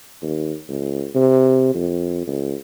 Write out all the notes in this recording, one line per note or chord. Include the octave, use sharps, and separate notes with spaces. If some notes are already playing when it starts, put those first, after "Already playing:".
D#2
C#2
C3
F2
C#2